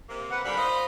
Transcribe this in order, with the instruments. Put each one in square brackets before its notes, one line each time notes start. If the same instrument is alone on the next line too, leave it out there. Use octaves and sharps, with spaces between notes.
[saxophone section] C3 A#3
[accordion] B4 F#5
[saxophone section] G#2 D3 G3 [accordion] B5
[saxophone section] F4 C5 D#5